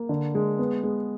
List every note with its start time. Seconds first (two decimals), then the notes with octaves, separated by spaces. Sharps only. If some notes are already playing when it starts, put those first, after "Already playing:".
Already playing: A#3
0.09 D3
0.35 G#3
0.59 B3
0.84 G#3